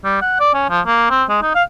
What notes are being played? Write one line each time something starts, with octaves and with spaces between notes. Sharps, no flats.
G3
F#5
D5
C#4
F3
A#3
C4
G#3
D#4
F5